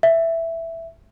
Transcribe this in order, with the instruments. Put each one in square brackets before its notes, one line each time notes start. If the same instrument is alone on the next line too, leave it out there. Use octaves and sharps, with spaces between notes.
[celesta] E5